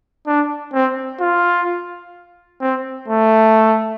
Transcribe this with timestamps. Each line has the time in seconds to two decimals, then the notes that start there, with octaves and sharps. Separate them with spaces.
0.27 D4
0.73 C4
1.20 F4
2.61 C4
3.08 A3